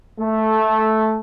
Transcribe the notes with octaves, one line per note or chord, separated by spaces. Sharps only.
A3